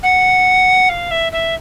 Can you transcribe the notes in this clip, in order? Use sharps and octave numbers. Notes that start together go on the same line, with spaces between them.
F#5
F5
E5
E5